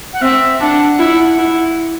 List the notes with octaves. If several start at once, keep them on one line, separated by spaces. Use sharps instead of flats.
F#5
C4 E5
D4 F#5
E4
E4